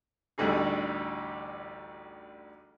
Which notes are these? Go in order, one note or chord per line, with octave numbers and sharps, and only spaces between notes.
A1 D2 D3 G3 D#4 G#4